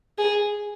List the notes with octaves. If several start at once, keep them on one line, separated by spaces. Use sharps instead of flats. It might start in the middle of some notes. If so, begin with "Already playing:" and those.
G#4